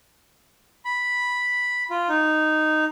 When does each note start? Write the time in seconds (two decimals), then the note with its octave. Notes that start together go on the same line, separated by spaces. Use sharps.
0.85 B5
1.90 F4
2.09 D#4